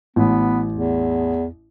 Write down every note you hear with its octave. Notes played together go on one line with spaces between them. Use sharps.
A1 B3
E2